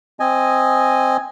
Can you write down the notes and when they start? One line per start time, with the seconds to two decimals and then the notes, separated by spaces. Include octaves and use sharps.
0.20 C4 D#5 G#5